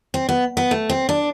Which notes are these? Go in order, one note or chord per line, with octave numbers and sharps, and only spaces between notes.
C4
B3
B3
A3
C4
D4